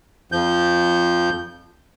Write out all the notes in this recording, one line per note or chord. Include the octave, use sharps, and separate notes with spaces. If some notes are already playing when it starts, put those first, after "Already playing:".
F2 F3 G6